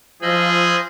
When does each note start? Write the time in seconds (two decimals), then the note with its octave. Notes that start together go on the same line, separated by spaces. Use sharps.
0.22 F3 F4 G#4 C5 D#5 B5 E6